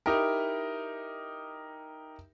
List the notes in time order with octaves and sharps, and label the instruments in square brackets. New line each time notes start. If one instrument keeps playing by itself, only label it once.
[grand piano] D#4 E4 G4 A#4